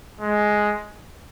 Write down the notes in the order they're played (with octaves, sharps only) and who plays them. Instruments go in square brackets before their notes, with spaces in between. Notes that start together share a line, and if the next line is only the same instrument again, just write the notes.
[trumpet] G#3